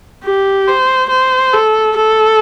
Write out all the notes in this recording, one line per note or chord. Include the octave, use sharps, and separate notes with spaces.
G4
C5
C5
A4
A4